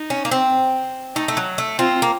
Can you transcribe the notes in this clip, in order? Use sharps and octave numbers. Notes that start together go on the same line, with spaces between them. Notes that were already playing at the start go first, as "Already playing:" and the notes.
Already playing: D#4
C#4
A#3
C4
A3 D#4
A3
F#3
A3
C4 F4
A#3